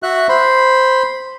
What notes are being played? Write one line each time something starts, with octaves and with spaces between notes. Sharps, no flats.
F#4 E5 F#6
C5 B5